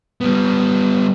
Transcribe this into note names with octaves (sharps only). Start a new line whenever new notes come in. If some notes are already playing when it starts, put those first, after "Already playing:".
G3 B3